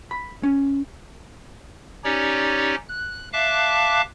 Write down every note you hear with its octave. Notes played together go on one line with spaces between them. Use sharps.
B5
C#4
C#4 D#4 G4 C#5 D5
F#6
E5 F5 A5 D6 F#6